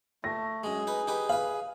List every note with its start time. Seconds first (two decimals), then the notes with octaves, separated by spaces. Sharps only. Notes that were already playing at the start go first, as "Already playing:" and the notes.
0.24 A3 A#6
0.64 F#2 G#3 G#4
0.87 D#4 B4
1.07 D#4 G4 B4
1.29 B4 F5 B5